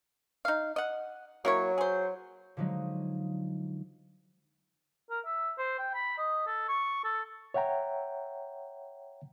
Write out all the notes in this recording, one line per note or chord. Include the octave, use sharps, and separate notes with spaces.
D#4 F5
D#5 F#5
F#3 A#3 E4 C#5
G#4 C5
D3 F3 F#3 G#3 D#4
A#4
E5
C5
G5
B5
D#5
A4
C#6
A4
C#5 E5 F#5 G5 A#5